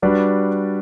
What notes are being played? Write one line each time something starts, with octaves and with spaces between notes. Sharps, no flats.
G3 D4 F#4 B4 D5